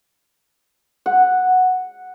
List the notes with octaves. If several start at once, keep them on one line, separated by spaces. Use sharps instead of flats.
F#5